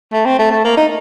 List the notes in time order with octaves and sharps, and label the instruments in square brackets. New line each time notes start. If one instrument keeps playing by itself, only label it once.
[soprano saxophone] A3
C4
A3
A3
A#3
D#4